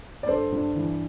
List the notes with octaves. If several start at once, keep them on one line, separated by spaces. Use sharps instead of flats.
D5
G2 A4 C5
G2
E3